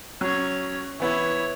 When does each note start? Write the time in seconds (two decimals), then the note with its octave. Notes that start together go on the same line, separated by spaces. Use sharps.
0.21 F#3 C#4 C#5
1.00 E3 B3 E4 C#5